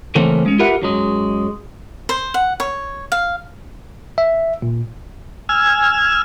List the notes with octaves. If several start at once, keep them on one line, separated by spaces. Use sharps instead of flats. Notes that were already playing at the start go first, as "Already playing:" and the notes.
C#3 E3 A3 A#3 C4 C#4
G#3 C#4
F4 G4 A#4 B4 E5 F#5
F#2 F#3 G#3
C5
F#5
C#5
F5
E5
A#2
G#5 E6 F6 G#6